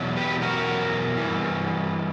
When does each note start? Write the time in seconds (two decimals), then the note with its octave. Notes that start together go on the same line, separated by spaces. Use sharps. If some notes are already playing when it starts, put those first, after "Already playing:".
Already playing: E2 B2 F#3
0.17 G4 B4
0.42 F#4 A#4
1.16 G2 E3